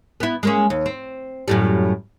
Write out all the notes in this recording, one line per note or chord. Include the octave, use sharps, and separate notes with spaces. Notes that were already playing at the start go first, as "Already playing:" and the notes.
B3 E4
G#3 A#3 C#4
D#2
C4
F#2 A2 G3